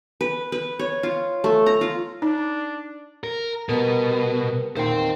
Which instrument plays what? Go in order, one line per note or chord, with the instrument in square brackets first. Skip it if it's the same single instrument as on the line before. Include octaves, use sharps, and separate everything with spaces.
[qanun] B4
B4
C#5
F4
A3
A#5
F4
[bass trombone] D4 [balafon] D#4
[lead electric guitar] A#4
[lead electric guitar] B2 [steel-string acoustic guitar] G3 B3 A#4
[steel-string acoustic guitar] E2 A#2 D#3 [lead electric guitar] C5 G5